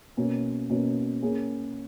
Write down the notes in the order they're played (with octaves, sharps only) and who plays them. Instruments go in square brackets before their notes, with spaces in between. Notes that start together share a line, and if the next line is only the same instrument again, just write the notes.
[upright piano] B2 A#3 C#4
B2 A#3 C#4
A#3 C#4 G#4